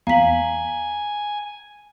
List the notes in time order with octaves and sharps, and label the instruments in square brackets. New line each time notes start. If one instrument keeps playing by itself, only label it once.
[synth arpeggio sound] E2 [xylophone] F5 B6 [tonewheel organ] G#5 [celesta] A#5 F#7